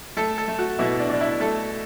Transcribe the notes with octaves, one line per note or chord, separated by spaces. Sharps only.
A3 A4
A4
A3
F#4
B2 E4
D4
B2 D4
E4
A3 A4